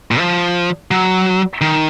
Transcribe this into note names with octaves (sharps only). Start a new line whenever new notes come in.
A#2
F3
F#3
D#3